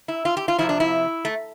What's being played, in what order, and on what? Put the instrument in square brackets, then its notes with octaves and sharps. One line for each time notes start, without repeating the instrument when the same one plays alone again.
[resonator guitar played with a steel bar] E4
F4
G4
F4
F2 C3 F3 E4
D4
E4
A3